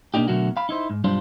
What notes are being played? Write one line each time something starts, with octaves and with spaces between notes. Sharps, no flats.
B2 A#3 D4 D#4 G4
B2 D3 F#3 A3 F#4 A#4
F5 B5
D#4 E4 C5
G#2
B1 G2 G3 D4 F4 C5